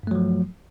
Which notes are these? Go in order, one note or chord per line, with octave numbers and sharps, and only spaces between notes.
G2 F3 F#3 A3